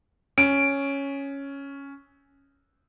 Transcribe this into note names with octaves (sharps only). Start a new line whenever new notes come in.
C#4 D7